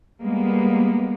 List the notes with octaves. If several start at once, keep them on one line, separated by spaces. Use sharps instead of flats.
G3 G#3 A#3 B3